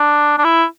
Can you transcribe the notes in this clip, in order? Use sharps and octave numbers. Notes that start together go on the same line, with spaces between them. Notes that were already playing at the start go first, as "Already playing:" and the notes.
Already playing: D4
D4
E4